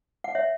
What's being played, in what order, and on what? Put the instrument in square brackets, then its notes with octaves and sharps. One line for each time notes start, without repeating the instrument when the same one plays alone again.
[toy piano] F#5
C#5 E5